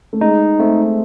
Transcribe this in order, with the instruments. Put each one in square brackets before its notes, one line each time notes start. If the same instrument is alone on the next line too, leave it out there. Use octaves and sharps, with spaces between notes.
[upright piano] A3
[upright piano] G#3 [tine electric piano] D#4
[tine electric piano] A3 [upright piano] C4